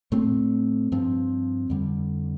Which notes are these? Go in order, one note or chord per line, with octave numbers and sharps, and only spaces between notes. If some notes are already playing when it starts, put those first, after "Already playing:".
A2 A3 C4
G2 F3 C4
F2 D3 G3